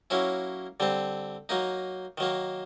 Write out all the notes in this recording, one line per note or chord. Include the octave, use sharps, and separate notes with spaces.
F#3 A#3 C#4 E4
D3 G3 C4
F#3 A#3 D#4
D#3 F#3 A#3